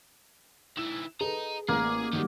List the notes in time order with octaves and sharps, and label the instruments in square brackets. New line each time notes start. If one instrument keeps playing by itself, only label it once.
[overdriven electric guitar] D#3 E4 [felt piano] E7
[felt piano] G#4 A4 B4 [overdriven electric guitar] D#5 A#5
[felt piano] A1 [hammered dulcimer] A#3 [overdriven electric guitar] G#4
[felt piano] D#3 F#3 G3 [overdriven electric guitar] A3 D#4